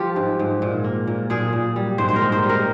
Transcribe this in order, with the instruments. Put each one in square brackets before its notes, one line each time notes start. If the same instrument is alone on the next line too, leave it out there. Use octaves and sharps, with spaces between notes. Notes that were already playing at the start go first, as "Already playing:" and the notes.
Already playing: [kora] F3 F4 G4
G#2
G#2
A#2
A#3
A#2
A#2 G#4
A#2
G3
G#2 C5
C5
A#4
D#3
C5
G3
A#4